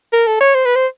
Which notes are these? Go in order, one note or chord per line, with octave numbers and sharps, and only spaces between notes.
A#4
A4
C#5
C5
B4
C5